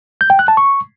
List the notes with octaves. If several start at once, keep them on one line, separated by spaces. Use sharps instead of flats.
G6
G5
F#6
A5
C#6